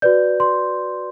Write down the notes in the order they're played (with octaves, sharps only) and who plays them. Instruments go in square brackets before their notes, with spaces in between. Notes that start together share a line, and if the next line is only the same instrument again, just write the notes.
[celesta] F#4 B4 D5 G6
C6